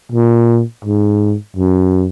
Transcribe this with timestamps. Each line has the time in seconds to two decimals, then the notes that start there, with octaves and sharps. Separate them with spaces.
0.12 A#2
0.85 G#2
1.56 F#2